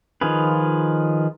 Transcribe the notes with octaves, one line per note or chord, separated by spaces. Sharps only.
D#3 F3 F4 G#4 B4